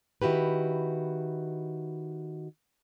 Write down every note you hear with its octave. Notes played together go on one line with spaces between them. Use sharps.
D#3 E4 F#4 G4 B4